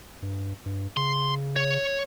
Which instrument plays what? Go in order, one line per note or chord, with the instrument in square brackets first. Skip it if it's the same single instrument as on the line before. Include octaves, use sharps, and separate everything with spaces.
[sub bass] G2
G2
[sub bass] C#3 [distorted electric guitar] C6
[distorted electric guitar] C#5